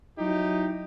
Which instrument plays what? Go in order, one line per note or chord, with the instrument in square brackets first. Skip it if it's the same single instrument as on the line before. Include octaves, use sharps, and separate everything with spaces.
[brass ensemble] F#3 D#4 E4 G4